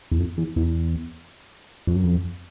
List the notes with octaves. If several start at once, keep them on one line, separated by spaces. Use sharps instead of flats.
E2
F2
E2
E2
F2
F#2
F2